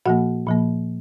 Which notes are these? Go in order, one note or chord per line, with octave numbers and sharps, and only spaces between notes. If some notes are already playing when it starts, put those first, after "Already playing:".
A#2 F3 A#3 F#4 F#5
A#2 F3 A#3